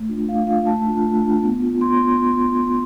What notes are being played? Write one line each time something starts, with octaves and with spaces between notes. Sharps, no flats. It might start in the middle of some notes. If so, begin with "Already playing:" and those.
Already playing: A3
D4 F4
A3 F5
D4 F4 F5
A3 A5
D4 F4
A3
D4 F4
B3
F4
B3 C6